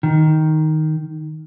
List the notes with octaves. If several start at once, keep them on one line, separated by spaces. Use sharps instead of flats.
D#3